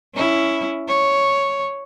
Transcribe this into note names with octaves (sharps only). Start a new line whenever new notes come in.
C#4 E4
C#5